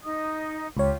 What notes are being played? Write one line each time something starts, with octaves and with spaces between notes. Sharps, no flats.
D#4 D#5 D#6
C#2 F4 G4 C#5